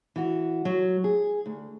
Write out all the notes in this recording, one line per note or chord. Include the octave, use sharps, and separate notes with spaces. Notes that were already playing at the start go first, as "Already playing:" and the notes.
E3 F#4
F#3
G#4
D2